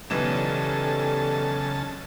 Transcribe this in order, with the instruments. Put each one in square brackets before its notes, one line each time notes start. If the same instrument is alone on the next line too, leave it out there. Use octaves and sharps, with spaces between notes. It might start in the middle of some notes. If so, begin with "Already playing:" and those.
[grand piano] B1 E3 E7 [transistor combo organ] C#3 A5 [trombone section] G3 A4